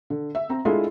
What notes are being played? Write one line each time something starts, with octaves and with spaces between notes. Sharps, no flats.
D3
E5
C4 A#5
G#3 D4 E4 F4 G#4 A4